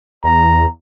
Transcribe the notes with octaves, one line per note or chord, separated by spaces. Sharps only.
E2 A#5